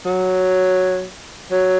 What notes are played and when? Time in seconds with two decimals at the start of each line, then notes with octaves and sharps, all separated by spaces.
0.05 F#3
1.51 F#3